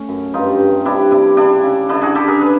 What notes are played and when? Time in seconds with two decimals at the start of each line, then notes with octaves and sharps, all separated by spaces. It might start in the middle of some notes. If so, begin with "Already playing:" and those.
Already playing: A3 C#4
0.09 F#2
0.34 G2 D#4 F4
0.60 G2
0.85 C3 D4 E4
1.11 C3 D4 E4
1.37 C#3 D4 E4
1.63 C#3
1.89 D3 D4 E4
2.02 F#4 G#4
2.15 D3 G4 A4
2.28 G#4 A#4
2.41 A4 B4